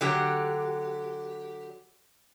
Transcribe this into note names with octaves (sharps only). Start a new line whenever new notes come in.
D3 F#3 G4